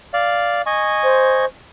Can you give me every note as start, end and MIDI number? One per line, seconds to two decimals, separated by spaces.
0.13 0.62 74
0.13 0.62 77
0.66 1.45 75
0.66 1.45 80
0.66 1.45 85
1.03 1.46 72